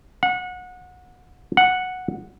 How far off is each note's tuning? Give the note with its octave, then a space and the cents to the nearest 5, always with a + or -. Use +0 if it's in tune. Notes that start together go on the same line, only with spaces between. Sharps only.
F#5 -25
F#5 -5